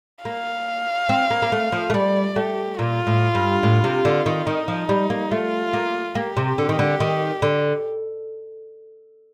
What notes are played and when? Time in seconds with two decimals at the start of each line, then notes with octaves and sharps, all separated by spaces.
0.25 A#3 F5
1.09 C4
1.30 A#3
1.42 A#3
1.52 A3
1.72 F3
1.90 A3
1.94 G3 D5
2.36 A3 G4
2.79 A#2 F4
3.07 A2
3.35 G2
3.63 A2
3.84 C3
4.05 D3
4.26 D#3
4.46 D#3 D#4
4.68 F3
4.89 G3
5.10 A#3
5.31 A3 F4
5.73 A#3
6.15 A#3 G4
6.37 C3
6.58 D3
6.69 D#3
6.79 D3
7.00 D#3
7.42 D3